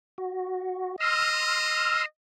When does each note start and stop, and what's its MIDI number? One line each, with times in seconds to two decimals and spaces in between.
0.18 0.96 66
1.00 2.04 75
1.00 2.05 84
1.00 2.05 88
1.00 2.05 89